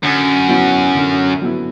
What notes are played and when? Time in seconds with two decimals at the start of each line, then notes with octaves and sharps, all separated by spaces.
0.03 F#2 D3
0.48 F#3 B3 E4
0.95 D3
1.42 F#3 B3 E4